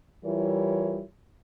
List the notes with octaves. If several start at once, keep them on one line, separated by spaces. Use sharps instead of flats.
E3 G3 E4 F4 A#4 C#5